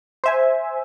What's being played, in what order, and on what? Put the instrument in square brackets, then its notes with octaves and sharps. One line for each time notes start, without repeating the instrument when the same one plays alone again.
[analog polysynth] C5 E5 G#5